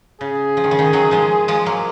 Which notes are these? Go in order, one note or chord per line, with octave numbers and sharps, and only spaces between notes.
C#3 G#4
F3
D#3
C#3
D#3
D#3 F#3
F3 G#3
F3 G#3
F#3 A#3